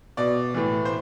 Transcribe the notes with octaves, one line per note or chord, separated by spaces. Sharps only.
B2 D5
A2 E3
C5